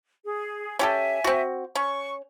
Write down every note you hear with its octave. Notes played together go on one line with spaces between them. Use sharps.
G#4
C#4 G4 A4 E5 G#5
C4 F#4
C#4 C#6